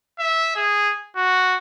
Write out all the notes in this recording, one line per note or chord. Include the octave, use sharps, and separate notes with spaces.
E5
G#4
F#4